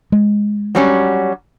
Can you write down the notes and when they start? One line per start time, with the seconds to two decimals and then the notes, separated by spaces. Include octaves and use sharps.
0.12 G#3
0.75 F#3 G3 C#4